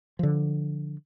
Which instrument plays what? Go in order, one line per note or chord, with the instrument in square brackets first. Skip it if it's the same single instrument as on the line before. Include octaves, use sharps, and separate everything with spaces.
[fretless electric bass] D3 F3